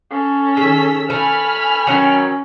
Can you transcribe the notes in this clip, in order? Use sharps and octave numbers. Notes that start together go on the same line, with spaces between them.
C#4 A4
D#3 G#4 E6 B6
A3 G#5 B5 F6
D#3 F#3 C#4